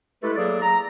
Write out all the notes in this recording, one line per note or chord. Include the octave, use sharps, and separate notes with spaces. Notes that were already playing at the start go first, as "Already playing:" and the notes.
G#3 A3 E4 G4 A4 B4
F#3 A#3 G#4 A4 D5
A#5